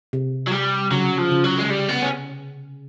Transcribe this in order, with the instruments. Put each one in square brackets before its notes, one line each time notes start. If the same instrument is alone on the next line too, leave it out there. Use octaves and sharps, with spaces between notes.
[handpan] C3
[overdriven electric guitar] F#3
G3
[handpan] C#3 [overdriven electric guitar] F#3
[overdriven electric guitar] F3
[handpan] C#3
[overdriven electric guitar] F#3
G#3
G3
B3
C#4